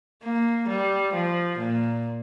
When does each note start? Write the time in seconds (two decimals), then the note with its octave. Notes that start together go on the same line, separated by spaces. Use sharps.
0.23 A#3
0.69 G3
1.14 F3
1.58 A#2